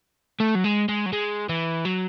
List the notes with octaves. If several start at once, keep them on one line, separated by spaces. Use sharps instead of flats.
A3
F#3
G#3
G#3
F#3
G#3
E3
F#3